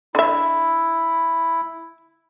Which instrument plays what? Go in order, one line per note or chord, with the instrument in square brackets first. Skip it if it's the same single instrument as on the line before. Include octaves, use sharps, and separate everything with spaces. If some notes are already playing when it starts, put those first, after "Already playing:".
[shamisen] D3 E5 [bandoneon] E4